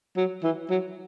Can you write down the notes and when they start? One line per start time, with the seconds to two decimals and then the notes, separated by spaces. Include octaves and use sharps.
0.17 F#3
0.43 E3
0.70 F#3